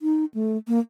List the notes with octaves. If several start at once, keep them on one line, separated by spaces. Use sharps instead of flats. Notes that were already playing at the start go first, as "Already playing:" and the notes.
D#4
A3
A#3